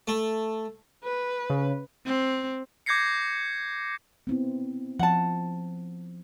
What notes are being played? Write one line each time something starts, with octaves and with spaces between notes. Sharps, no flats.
A3
B4
C#3
C4
D6 G6 G#6 A#6 C7 C#7
B3 C4 E4
F3 F#5 A5